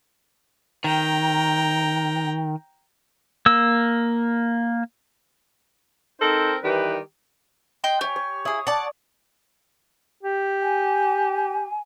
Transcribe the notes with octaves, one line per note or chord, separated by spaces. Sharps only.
D#3 G5 A#5
A#3 E6
C4 D#4 A4 A#4 C5
D#3 E3 G3 G4 B4
D#5 G5 C6
G4 C#5 G#5
C#5
E4 G#4 D#6
D5 F#5 A5
G4
G#5